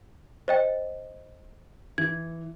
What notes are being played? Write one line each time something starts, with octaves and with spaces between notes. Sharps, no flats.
C5 D#5 G5
E3 G#6